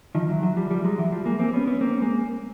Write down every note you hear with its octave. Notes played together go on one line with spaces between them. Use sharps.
D#3 F3
E3 F#3
E3 F#3
F3 G3
F3 G3
F#3 G#3
E3 F#3
F3 G3
G#3 A#3
A#3 C4
B3 C#4
B3 C#4
A#3 C4
G#3 A#3